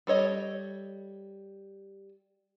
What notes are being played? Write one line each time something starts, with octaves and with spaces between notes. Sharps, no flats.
G3 A4 C#5 D#5